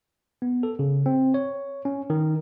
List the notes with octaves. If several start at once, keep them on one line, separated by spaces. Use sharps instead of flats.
B3
A4
C#3
C4
C#5
C#4
D#3